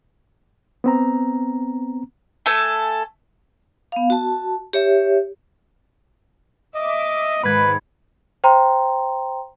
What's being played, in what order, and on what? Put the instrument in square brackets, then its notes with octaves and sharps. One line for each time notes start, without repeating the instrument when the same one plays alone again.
[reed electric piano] B3 C4 A#5
[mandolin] A3 A4 G#5
[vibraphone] B3 F5
F#4 A5
G4 C#5 E5
[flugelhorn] D#5 [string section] E5 D6
[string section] G#2 D#3 [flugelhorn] B4 [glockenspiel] B5 G#6
[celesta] C5 G5 A#5 C6